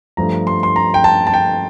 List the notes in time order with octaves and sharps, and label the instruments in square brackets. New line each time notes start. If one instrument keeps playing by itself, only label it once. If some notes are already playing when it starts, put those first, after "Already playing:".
[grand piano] G2 F3 A3 A#5
C6
C6
A#5
G5
A5
A5
G5